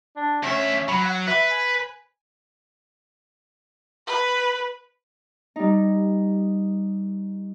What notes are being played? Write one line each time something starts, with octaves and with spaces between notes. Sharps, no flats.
D4
D2 C#4 E5
F#3 B5
F#5
B4 E5
G#5
B4
G3 D#4